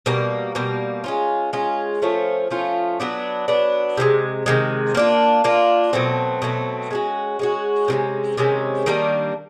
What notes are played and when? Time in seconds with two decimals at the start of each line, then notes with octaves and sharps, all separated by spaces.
0.06 B2 G3 A#3
0.55 B2 G3 A#3
1.04 G#3 C#4 F4
1.53 G#3 C#4 F4
2.02 F3 A3 C#4 F4
2.50 F3 A3 C#4 F4
3.00 F#3 B3 D4
3.48 F#3 B3 D4
3.97 C3 D#3 G#3
4.46 C3 D#3 G#3
4.95 A#3 D4 F4
5.44 A#3 D4 F4
5.93 B2 F#3 A3 C4
6.42 B2 F#3 A3 C4
6.91 G#3 C#4 F#4
7.39 G#3 C#4 F#4
7.88 C3 D#3 G#3 C#4
8.37 C3 D#3 G#3 C#4
8.86 D#3 G3 A#3 D4